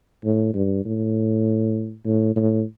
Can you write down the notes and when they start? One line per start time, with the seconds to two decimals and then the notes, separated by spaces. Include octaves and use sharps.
0.25 A2
0.54 G2
0.85 A2
2.06 A2
2.36 A2